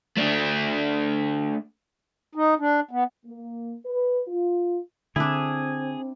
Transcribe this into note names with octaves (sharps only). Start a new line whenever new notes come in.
A3 D4
D#4
D4
B3
A#3
B4
F4
D3 C4 D4 E4 G#4